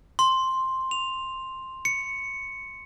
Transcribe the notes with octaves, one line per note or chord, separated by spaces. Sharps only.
C6
F7
C#7